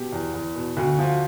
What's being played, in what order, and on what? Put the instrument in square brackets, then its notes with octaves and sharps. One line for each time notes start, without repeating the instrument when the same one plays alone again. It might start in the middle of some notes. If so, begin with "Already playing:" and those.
Already playing: [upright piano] B2 G4
E2
E2
B2
D2 F#4
F3